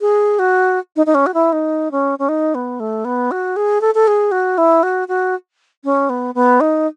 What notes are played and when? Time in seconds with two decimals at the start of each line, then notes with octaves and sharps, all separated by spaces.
0.01 G#4
0.39 F#4
0.96 D#4
1.06 D#4
1.14 C#4
1.26 F#4
1.34 E4
1.52 D#4
1.91 C#4
2.19 C#4
2.29 D#4
2.55 B3
2.80 A3
3.05 B3
3.31 F#4
3.56 G#4
3.81 A4
3.95 A4
4.07 G#4
4.31 F#4
4.58 E4
4.83 F#4
5.08 F#4
5.84 C#4
6.09 B3
6.35 B3
6.60 D#4